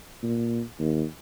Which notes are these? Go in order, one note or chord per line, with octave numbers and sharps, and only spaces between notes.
A#2
D#2